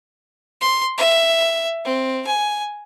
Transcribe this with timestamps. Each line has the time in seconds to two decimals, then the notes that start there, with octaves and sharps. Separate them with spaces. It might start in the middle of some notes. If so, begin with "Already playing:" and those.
0.61 C6
0.98 E5
1.85 C4
2.27 G#5